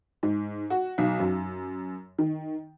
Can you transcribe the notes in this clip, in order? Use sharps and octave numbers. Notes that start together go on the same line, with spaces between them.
G#2
F#4
B1
F#2
D#3